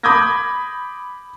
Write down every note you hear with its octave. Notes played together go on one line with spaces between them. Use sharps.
B5 D6 D#6 G6 G#6 A#6